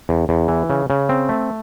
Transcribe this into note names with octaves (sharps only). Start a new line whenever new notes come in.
E2
E2
E3
C#3
C#3
C4
A3